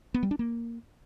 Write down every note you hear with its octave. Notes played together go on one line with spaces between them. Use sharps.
B3
G3
D4
A#3